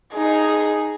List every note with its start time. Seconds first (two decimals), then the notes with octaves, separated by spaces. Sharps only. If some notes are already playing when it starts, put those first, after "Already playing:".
0.14 D#4 G#4